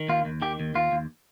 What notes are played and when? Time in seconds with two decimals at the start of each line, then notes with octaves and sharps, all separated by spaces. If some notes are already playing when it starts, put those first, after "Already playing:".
Already playing: D#3
0.09 D#2 F4
0.25 D#2
0.42 D#3 G4
0.60 D#2
0.75 D#2 F4
0.92 D#2